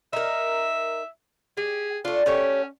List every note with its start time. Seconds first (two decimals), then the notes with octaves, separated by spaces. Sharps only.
0.13 D#4 A#4 E5
1.57 G4 G#4
2.05 A3 D4 F4
2.26 A3 C#4 G4 C#5